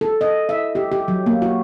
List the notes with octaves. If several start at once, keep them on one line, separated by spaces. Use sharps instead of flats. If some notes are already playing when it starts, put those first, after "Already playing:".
A4
D#5
E5
G4
G4
F#3
A#3
F#4